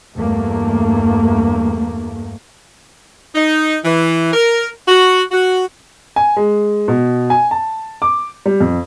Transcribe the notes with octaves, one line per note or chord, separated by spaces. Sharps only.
E2 G2 A3 A#3
D#4
E3
A#4
F#4
F#4
G#5
G#3
B2
G#5
A5
D6
G3
F2